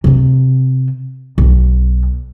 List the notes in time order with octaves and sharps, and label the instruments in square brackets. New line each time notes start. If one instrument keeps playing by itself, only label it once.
[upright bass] C3 C4
B1